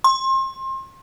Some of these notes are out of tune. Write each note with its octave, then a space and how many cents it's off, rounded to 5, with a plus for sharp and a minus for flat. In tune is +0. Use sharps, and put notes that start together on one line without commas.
C6 +30